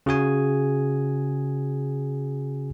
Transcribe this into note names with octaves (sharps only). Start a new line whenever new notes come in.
C#3 F#4 G#4 G#5